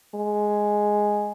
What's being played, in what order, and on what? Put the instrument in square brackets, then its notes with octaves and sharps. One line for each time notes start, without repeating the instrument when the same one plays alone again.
[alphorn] G#3